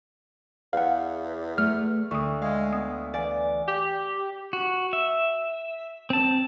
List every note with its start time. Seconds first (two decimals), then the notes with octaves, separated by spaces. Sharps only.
0.73 E2 F5 F#5
1.58 A3 F6
2.11 D2 C#6 D#6
2.42 G#3 F5
2.73 B3 D#6
3.14 E3 D5 F5 G#5
3.68 G4
4.53 F#4
4.93 E5
6.10 C4 A5